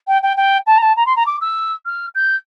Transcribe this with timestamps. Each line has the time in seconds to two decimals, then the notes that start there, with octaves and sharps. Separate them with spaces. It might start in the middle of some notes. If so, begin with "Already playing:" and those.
0.08 G5
0.23 G5
0.37 G5
0.67 A5
0.78 A#5
0.82 A5
0.97 A#5
1.06 C6
1.16 A#5
1.26 D6
1.41 E6
1.86 F6
2.15 G6